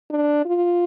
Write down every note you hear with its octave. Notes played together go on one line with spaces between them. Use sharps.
D4
F4